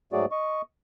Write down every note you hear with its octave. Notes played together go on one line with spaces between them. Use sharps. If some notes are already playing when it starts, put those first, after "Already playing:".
G#2 F#3 A3 F#4 G#4 D5
D#5 C#6